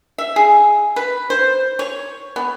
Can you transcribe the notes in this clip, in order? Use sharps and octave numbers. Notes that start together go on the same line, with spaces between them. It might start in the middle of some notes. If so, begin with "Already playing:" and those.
E5
G#4
B4
C5
C#5
B3